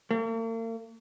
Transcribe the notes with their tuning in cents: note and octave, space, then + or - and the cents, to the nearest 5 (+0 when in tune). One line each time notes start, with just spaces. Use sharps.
A#3 -45